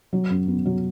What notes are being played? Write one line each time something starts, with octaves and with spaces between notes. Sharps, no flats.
F#3
F#2
B3
F#3